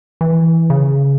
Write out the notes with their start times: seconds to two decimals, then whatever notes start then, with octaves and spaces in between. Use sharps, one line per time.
0.21 E3
0.70 C#3